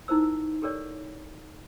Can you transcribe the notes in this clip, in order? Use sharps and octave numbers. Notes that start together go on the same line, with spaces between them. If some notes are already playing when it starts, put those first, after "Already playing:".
D#4 E4 A#4 C5 E6
G4 A4 A#4 C#5 D5